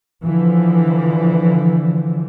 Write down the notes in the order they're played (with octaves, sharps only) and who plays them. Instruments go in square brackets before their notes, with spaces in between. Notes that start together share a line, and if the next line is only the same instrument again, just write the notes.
[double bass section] D3 E3 F3